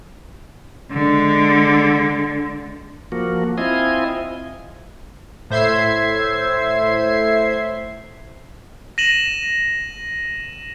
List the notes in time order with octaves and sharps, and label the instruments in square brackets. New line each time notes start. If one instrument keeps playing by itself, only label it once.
[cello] D3 G#3
[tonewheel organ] F3 A#3 F#4
C4 E4 F4 D#5 G#5
[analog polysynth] A2 C5 E5 G#6 C7
[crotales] A#6 D#7 E7 F#7